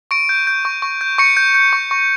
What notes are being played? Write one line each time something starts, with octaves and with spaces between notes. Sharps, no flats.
C#6 D7
G6
G6
C#6
C#6
G6
C#6 C#7
G6
G6
C#6
C#6